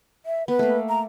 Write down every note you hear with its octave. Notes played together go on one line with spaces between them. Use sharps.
E5
B3 B4
A3 A#3
A#5